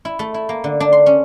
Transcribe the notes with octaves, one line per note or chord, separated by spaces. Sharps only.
E4
A3
E4
A#3
D3
D4
C6
C#4